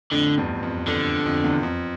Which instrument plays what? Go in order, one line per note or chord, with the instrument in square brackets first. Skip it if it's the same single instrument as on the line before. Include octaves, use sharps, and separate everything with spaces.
[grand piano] F2 A2 [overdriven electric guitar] D3
[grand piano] E2 G2
F2
[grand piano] F2 [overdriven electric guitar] D3
[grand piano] F2
E2
F2